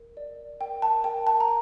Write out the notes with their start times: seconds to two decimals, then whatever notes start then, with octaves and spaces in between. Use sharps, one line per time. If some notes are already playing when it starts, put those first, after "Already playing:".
Already playing: A#4
0.17 D5
0.61 A#4 G5
0.82 A5
1.04 A#4 G5
1.27 A5
1.40 A#5